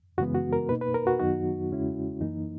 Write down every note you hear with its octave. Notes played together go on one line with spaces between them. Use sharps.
F#2 C#3 E3 G#3 B3 F#4
F#4
A#4
B2 A#3 D#4 B4
B4
A#4
F#4
F#2 D#3 F#3 B3 D#4 F#4
E2 C#3 G#3 C#4 E4
F#2 E3 A#3 D#4